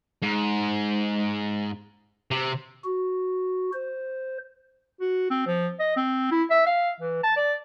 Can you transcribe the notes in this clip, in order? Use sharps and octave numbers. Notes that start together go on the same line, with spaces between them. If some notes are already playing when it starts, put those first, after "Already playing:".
G#2
C3
F#4
C5
F#4
C4
F3
D#5
C4
E4
E5
F5
E3
A5
D5